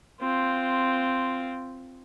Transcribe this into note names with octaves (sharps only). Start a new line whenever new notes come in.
C4 F4